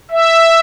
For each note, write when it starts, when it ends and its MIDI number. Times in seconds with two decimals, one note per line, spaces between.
0.11 0.60 76